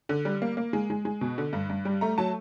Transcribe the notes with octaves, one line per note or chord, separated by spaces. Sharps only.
D3
G3
A#3
A#3
G#3
G#3
G#3
B2
D3
G2
G2
G3
A3 A#5
F#3 A5